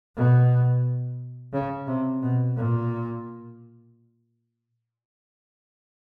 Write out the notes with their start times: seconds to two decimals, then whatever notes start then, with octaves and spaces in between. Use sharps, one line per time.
0.16 B2
1.53 C#3
1.88 C3
2.23 B2
2.56 A#2